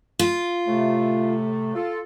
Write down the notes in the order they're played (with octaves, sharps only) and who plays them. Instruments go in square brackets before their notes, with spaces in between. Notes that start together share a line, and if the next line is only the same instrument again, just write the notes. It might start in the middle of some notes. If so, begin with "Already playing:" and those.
[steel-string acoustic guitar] F4
[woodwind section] A2 C3 A3
F4 A4